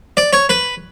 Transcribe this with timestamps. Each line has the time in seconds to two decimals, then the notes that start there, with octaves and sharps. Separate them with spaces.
0.17 D5
0.33 C#5
0.49 B4